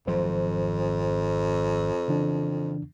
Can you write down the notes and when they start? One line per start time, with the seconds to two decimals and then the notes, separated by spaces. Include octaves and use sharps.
0.07 G#1 F2 F3 F#3 C5
2.08 C#3 E3 D4